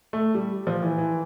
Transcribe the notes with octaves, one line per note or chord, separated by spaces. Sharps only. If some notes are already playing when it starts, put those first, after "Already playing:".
A3
G3
F3
E3
E3